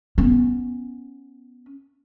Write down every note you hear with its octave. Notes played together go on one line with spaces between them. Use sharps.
B3 C#4